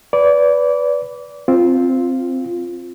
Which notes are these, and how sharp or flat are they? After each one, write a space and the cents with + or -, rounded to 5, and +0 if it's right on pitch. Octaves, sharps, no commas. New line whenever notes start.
B4 +0 D5 -25
C4 +0 F4 +0